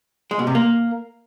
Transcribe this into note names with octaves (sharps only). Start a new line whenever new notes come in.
G#3
B2
C3
A#3